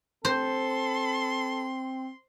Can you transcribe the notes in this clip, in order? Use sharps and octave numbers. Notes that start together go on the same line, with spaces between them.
C4 A4 C5 C6